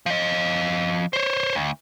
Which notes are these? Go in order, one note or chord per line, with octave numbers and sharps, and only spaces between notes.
F3 D#5
C5 C#5
D2